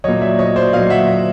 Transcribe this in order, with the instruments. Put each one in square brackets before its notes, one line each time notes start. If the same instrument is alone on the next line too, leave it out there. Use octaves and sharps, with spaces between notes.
[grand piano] A#2 F#3 C#5 D#5
D5 E5
C#5 D#5
C5 D5
A#2 F#3 D#5 F5
E5 F#5